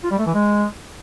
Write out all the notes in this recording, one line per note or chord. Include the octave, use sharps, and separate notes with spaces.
F4
G3
A3
E3
G#3